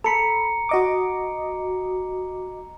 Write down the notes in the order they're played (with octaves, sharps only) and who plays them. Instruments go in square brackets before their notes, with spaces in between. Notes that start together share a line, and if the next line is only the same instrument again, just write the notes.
[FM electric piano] A4 B5 [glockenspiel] A#5 C#7
[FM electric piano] F#4 D#5 D6